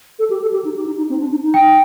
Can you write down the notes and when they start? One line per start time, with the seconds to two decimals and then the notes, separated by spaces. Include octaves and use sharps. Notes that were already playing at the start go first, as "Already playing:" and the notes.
0.19 A4
0.30 G4
0.41 A4
0.53 G4
0.64 D#4
0.76 G4
0.86 D#4
0.98 D#4
1.09 C4
1.20 D4
1.31 D#4
1.43 D#4
1.54 G5